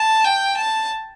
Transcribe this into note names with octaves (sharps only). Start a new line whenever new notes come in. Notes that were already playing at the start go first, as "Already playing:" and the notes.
Already playing: A5
G5
A5